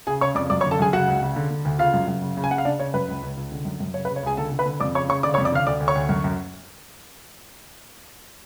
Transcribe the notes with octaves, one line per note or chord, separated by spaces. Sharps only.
C#3 G#4 G#5
C#3 C#5 C#6
F2 D5 D6
F#2 D5 D6
C#5 C#6
D3
A4 A5
F#2 G#4 G#5
C#3 F#4 F#5
C#2
C#3
D3
D3
D2
C#3 F4 F5
F#2
F#2
C#3
C#3
G#5
C#3 F#5
F5
C#3 D4 D5
C#3 C#5
F#2 B4
C#2
C#2
C#2
D3
F#2
F#2
C#3 C#5
B4
C#3
C#5
C#2 G#4 G#5
D3 A4 A5
D3
B4 B5
D3
F2 D5 D6
C#3 C#5 C#6
C#3 C#5 C#6
D3 D5 D6
C#5 C#6
F2
D5 D6
D3 F5 F6
D2 D5 D6
D2
C#5 C#6
D2
F#2
F#2